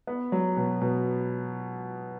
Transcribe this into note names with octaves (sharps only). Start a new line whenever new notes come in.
B3
F#3
B2
B2